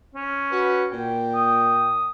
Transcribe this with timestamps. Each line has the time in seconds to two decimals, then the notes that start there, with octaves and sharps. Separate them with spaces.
0.15 C#4
0.52 F#4 B4
0.93 A#2 G5
1.34 D#6